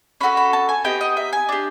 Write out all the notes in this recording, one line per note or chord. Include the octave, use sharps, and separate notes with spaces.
C#4 F#4 A4 B5
B5
A5
G#5
B3 D#4 G4 G5
D#5
E5
G#5
D4 G4